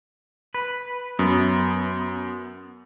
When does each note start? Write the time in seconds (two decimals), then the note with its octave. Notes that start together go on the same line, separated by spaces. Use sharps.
0.54 B4
1.19 F#2 B3